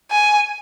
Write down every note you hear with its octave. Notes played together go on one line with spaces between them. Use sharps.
G#5